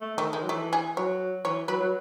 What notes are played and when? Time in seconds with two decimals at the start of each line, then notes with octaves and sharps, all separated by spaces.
0.01 A3
0.17 D#3 A3
0.33 D#3 G#3
0.43 F#3
0.49 E3 A3
0.73 G#4
0.97 F#3 C#5
1.45 E3 C#5
1.68 F#3 B4
1.80 F#3